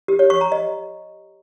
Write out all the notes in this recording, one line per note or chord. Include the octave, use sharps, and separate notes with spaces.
G4
C#5
C#6
A#5
D#5